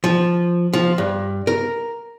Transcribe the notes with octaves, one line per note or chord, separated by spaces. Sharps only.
F3
F3
G2
A#4